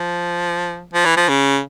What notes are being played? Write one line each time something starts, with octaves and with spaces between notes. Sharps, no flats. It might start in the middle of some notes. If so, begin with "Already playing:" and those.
Already playing: F3
F3
E3
F3
C#3